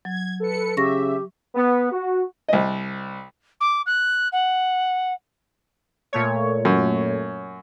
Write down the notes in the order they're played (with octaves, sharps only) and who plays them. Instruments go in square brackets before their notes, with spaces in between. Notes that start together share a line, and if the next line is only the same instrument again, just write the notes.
[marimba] F#3 [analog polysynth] G#6
[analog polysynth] A4 B4 C#7
[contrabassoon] C#3 [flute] G4 [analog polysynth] E5 [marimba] C#6 A#6
[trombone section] B3
F#4
[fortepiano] C2 D#5
[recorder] D6
F#6
F#5
[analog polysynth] A#2 A3 C#5
[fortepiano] F#2